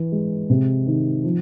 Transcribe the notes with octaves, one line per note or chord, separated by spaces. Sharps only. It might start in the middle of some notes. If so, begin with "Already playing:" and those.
Already playing: E3
G#3
C3
D#3
F3